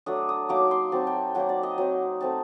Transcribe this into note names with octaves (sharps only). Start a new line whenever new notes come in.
F#3 A3 D4 D#6
D#6
F#3 A#3 D#4 D6
C6
F#3 C4 D#4 A5
G5
F#3 A#3 D#4 F#5
D5
D#5
F#3 C4 D#4
A3 C4 D#4 A5